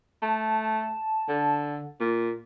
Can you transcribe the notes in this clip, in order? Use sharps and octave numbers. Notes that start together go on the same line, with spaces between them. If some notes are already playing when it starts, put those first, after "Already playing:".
A3 A5
D3
A#2